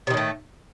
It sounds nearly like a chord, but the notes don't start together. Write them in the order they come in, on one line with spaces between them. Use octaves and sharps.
C3 D#3 A2 A3